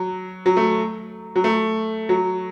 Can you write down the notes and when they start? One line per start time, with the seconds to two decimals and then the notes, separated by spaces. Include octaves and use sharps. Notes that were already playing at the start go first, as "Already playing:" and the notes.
Already playing: F#3
0.46 F#3
0.57 A3
1.36 F#3
1.44 A3
2.09 F#3